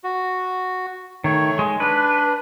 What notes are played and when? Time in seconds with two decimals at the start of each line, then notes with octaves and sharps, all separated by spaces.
0.04 F#4
1.24 D#3 A3 C#5
1.59 G#3
1.80 D4 B4